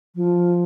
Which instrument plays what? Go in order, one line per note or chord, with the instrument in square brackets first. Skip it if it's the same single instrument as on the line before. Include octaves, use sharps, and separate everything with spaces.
[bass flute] F3